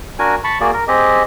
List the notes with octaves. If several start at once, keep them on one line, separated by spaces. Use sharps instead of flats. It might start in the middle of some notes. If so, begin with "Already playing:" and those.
D4 F#4 A#4 G#5
A5 B5 C#6
A#3 F#4 G#4 D5
A#4
C4 G4 G#4 D#5